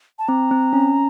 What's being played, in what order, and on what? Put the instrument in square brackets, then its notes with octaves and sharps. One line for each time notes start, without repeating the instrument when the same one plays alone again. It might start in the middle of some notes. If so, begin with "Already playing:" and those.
[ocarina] A5
[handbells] C4 [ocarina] A#5
[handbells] C4
C#4